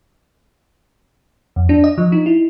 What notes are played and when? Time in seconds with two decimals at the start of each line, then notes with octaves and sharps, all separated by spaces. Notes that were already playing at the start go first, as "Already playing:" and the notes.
1.56 F2
1.69 D4
1.84 D#5
1.98 F3
2.12 D#4
2.26 E4